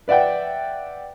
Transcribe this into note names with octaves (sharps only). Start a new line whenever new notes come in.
B4 D5 E5 F#5 G5